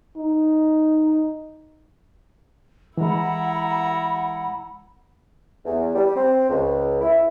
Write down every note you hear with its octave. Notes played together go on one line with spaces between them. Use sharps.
D#4
E3 G#3 E4 F#5 A#5 B5
E2
G3
C4
C#2
E4